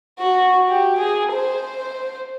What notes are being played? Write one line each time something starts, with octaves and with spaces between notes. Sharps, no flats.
F#4
G4
G#4
C5